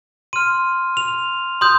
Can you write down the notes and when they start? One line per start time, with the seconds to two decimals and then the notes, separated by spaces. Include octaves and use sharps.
0.33 C6 F6 D#7
0.97 F7
1.61 C6 D#6 G6